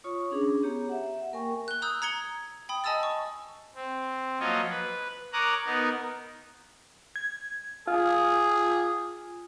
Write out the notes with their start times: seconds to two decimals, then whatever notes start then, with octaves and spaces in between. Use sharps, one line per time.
0.04 F4 C#5 C#6 D#6
0.31 C#4 D4 G#4
0.63 B3 G4 C#5 A#5
0.89 E5 F#5
1.33 A#3 A#4 G5 G#5 C#6
1.68 F#6 G7
1.82 A#5 D#6 E6 G6
2.02 A#5 G#6 C#7 G7
2.69 G5 B5 D#6
2.84 D#5 G#5 A5 D#6 E6 A6
3.03 C#6
3.75 C4
4.40 F3 F#3 A#3 F4 C#5 D#5
4.70 B4
5.33 A#4 C#5 A#5 D6 D#6 F#6
5.66 B3 D#4 A#4
7.16 G#6
7.87 F4 G#4